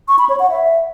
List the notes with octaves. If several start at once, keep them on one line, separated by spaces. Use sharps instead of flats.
C#6
B5
C#5
F#5
E5